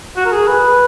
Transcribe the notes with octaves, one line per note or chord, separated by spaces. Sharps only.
F#4
A#4
G#4
B4